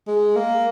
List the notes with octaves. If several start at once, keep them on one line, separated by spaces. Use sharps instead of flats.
G#3
A#3